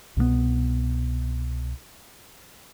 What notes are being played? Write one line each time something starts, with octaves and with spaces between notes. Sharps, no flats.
C2 B2 G3 B3